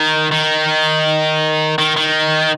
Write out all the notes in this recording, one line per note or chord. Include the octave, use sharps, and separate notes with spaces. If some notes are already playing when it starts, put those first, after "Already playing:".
Already playing: D#3
D#3
D#3
D#3